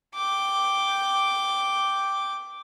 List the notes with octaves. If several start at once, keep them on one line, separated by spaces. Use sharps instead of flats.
G5 D6